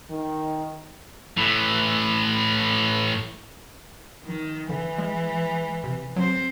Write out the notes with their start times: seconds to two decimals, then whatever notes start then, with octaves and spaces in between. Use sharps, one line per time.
0.10 D#3
1.38 A2 E3
4.24 D#3
4.69 D3 E3
4.98 G#3
5.84 C3
6.16 F#3 C4 C5